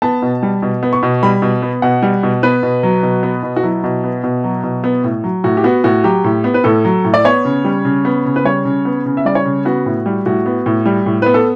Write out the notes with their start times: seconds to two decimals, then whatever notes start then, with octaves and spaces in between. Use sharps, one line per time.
0.02 B3 A5
0.22 B2
0.43 G3
0.62 B2
0.83 B3
0.93 C#6
1.03 B2
1.23 G3 B5
1.42 B2
1.62 B3
1.82 B2 F#5
2.03 G3
2.23 B2
2.43 B3 B4
2.63 B2
2.83 F#3
3.03 B2
3.23 B3
3.43 B2
3.56 F#4
3.63 F#3 E4
3.84 B2
4.04 B3
4.24 B2
4.44 F#3
4.64 B2
4.84 B3
5.04 A2
5.24 F#3
5.44 A2 F#4
5.57 G4
5.64 B3 F#4
5.84 A2 F#4
6.04 F#3 G4
6.24 A2
6.44 B3
6.54 B4
6.64 A2 A4
6.85 F#3
7.05 A2
7.14 D5
7.25 B3 C#5
7.45 C#3
7.65 G3
7.85 C#3
8.05 B3
8.25 C#3
8.36 B4
8.45 G3 C#5
8.65 C#3
8.85 B3
9.06 C#3
9.17 E5
9.25 G3 D5
9.35 C#5
9.45 C#3
9.65 B3 F#4
9.86 A2
10.06 G3
10.26 A2 F#4
10.46 B3
10.66 A2
10.86 G3
11.06 A2
11.22 B3 B4
11.34 A4